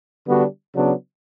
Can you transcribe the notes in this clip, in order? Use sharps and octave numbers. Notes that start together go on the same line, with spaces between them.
D3 G3 B3 D4 F#4
C#3 F#3 B3 D4